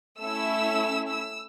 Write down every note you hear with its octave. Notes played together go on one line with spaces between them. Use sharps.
A3 C#4 E4 E6
E6